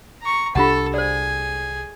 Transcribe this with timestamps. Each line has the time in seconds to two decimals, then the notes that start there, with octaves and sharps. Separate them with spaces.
0.22 A#5 C#6
0.55 C2 F3 D4 F4 G4 A4 F#5 A5
0.94 G#4 C5 D5 G#5